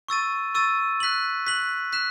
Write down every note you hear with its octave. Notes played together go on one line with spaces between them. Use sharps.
C#6 E6 A6 D#7
C#6 E6 A6 D#7
F#6 B6 F#7
F#6 B6 F#7
F#6 B6 E7